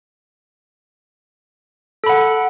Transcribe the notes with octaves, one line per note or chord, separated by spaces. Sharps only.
A4 F#5 B5